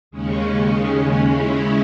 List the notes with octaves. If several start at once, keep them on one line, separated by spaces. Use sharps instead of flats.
D#2 C#3 G#3 C#4
C#3 G#3 C#4 E4